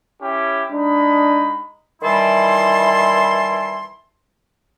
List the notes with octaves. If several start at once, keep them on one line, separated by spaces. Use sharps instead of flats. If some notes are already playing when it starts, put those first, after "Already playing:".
C#4 E4 G4
G#3 D4 D#4 B5
D#3 E3 G3 E4 A5 C6